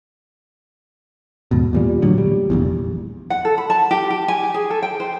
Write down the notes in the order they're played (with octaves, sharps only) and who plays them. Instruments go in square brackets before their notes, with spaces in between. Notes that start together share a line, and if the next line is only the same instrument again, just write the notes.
[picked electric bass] D#2 G#2 B2
E2 A#2 G3
A2 D3 F#3
G3
F1 A#1 E2
[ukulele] F#5
A4
B5
A5
G4
G4
G#5
G4
G#4
A4
G5
C5